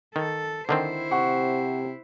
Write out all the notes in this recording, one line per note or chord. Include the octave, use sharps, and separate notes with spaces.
D#3 A4
D3 D#3 C4 E4 C5
C3 F#5 C#6